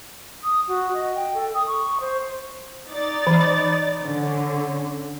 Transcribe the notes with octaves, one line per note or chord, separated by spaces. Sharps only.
D#6
F#4
D#5
G5
A4
D#6
C#6
C5
D#4 D5 A6
E3
D3 C#4